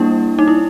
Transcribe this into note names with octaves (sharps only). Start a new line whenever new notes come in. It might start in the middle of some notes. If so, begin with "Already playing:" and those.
Already playing: G3 A#3 D4 E4
D#4
E4